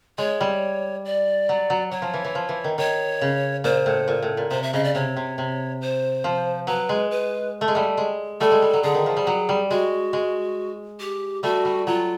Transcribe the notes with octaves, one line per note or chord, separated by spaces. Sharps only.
G#3 C#5
G3
D5
F#3
F#3
F#3 C#5
F3
E3
E3
F3
E3
D#3
D#3 C#5
C#3
A#2 C5
A2
A#2
A2
A#2
C3 C5
E5
C#3 D#5
D5
C3 C#5
C3
C3
C5
F3
F#3 B4
G#3
B4
A3
G#3
G3 A3
G#3
G3 A3 A4
G#3
G3
F#3
D3 G#4
D#3
F3
G3
F#3
G3
G#3 F#4
G#3
G4
G3 A3 F#4
G3
F#3 F4